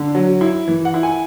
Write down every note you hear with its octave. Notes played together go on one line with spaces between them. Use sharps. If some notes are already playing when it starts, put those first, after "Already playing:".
Already playing: D3
F#3
E4
E3
F#5
E4
G#5